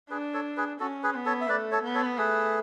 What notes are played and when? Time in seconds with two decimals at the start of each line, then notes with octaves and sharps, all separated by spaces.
0.10 D4 G#4 B4
0.34 A4 C#5
0.57 G#4 B4
0.80 C#4 F#4 A4
1.03 G#4 B4
1.15 B3
1.26 A4 C#5
1.41 E5
1.49 A3 B4 D5
1.72 A4 C#5
1.84 B3
1.95 A4 C#5
2.18 A3 G#4 B4